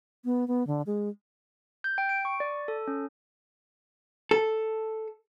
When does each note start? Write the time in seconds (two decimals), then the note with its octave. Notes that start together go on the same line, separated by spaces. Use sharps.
0.25 B3
0.48 B3
0.67 D3
0.86 G#3
1.84 G6
1.98 G5
2.09 D7
2.25 C#6
2.40 D5
2.68 A4
2.87 C#4
4.31 A4